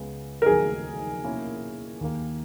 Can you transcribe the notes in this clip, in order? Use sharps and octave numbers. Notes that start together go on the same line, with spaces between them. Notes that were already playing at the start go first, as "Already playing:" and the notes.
Already playing: C#2 C#3 G#3 B3
A#4
D#2 C#3 F#3 G#4
B2 A#3 C#4 E4
D#2 D#3 A#3